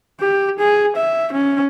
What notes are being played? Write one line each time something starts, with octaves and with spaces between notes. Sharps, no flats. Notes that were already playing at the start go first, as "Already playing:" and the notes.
G4
G#4
E5
C#4